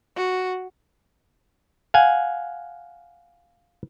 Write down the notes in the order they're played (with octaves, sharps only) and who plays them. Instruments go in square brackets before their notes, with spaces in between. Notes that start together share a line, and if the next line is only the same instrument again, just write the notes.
[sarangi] F#4
[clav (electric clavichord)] F5 F#5 G#5